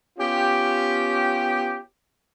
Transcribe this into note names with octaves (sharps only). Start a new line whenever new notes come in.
B3 C#4 F4 G4